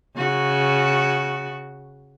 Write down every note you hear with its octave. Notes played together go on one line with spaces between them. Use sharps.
C#3 F#4